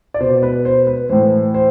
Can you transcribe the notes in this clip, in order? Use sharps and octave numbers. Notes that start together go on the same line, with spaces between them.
D5
B2 C5
B4
C5
B4
A2 E3 C5
C5